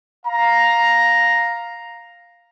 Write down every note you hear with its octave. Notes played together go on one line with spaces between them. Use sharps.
F5 A#5